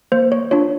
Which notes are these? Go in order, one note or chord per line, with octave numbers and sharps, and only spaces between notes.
A#3 C5
C#5
D4 F4 C#5